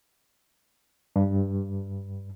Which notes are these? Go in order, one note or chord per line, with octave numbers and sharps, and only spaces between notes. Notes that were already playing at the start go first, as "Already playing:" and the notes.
G2